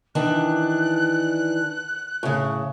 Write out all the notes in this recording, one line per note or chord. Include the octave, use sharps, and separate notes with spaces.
D#3 E3 D4 F#6
A2 C#3